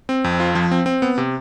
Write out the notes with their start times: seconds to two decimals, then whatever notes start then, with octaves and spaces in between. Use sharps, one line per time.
0.09 C4
0.24 F2
0.40 F4
0.55 F3
0.71 C4
0.86 C4
1.02 B3
1.18 C3